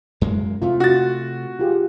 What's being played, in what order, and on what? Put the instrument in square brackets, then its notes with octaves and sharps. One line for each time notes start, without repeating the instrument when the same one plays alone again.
[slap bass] F#2 G#3 A#3
[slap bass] C3 A3 [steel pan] F4
[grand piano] F#4 A6
[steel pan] F4 G4 G#4